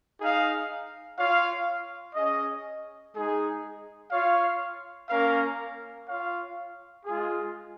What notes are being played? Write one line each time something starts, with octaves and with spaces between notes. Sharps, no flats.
D#4 G#4 F5
F4 C#5 F5
C#4 G#4 D#5
G#3 D#4 G#4
F4 C#5 F5
A#3 C#4 A#4 F5
F4 C#5 F5
G#3 F4 G#4